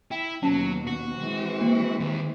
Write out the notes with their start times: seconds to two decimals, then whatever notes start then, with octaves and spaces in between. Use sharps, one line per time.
0.11 E4 G5
0.43 D#2 B2 F#3 C#4 A5
0.87 F#4
1.17 E3 G#3 C4
1.61 A#3
2.00 D#2 D#3